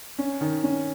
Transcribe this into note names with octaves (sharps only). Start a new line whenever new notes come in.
C#4
D#3
C#4